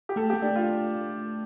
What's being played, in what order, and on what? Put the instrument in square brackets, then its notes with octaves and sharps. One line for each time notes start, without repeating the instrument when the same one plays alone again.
[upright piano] G4
[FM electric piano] A3 [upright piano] A4
[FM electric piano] A3 [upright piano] G4
[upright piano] D4
[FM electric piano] A3
[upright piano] F4